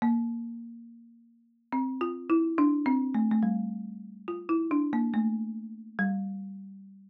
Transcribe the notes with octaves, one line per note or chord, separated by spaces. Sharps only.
A#3
C4
F4
E4
D4
C4
A3
A3
G3
F4
E4
D4
A#3
A3
G3